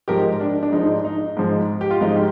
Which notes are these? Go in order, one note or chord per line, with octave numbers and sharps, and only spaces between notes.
G#2 F3 G#3 G4 A#4
D4
D4
G#2 F3 G#3 D#4
D#4
G#2 F3 G#3
G4
F4
G#2 F3 G#3 D#4
G4